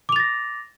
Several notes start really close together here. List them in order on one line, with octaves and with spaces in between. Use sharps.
D6 F7 A6 A#6